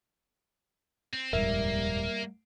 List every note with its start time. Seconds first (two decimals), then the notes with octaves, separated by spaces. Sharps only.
1.14 C4
1.33 D#1 F2 G#2 G3 A#3 A#4 E5